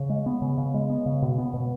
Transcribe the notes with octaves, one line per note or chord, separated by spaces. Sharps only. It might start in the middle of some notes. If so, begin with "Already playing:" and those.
Already playing: C#3
G#3
B3
C#3
C#3
G#3
B3
C#3
B2
B3
B2